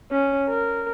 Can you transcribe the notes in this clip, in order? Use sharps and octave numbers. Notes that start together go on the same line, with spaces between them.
C#4
A#4